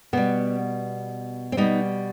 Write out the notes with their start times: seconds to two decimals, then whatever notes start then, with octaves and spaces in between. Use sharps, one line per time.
0.13 B2 G3 B3
1.52 C4
1.57 B2 G3 B3 D#4